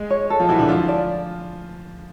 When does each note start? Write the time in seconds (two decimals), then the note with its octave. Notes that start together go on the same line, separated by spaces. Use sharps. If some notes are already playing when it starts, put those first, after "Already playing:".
Already playing: G#3 G#4
0.10 C#5
0.30 A4
0.40 F3 F4
0.49 E3 E4 F#4
0.59 D3 D4
0.68 F3 F4 A4
0.88 D5